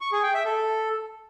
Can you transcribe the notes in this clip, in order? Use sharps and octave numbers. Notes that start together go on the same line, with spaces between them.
C#6
G#4
G5
E5
A4